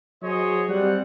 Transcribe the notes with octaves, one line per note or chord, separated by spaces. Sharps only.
F#3 G#4 C5 C#5 D#5
G3 C4 F#5